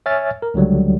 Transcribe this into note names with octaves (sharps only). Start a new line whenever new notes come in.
C#5 E5 G#5 F6 A6
A#4
C#2 D3 F#3 G3